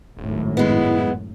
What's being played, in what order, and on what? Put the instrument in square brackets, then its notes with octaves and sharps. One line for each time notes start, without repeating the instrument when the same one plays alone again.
[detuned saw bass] D#1 [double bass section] G#1 F#2 A2
[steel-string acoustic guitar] G#3 B3 [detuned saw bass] E4